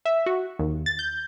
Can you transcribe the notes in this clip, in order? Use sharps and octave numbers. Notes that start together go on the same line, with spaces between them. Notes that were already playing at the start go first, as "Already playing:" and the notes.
E5
F#4
D#2
A6
G6